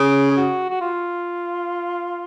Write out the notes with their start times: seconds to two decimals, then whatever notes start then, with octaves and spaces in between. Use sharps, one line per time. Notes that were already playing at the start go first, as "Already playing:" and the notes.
Already playing: C#3 G#4
0.31 G#4
0.37 F#4
0.70 F#4
0.81 F4